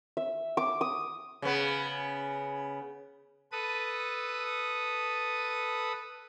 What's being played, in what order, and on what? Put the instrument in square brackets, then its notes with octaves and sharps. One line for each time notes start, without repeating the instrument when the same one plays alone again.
[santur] E5
D6
D#6
[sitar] C#3 B3
[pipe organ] A4 B4 D#6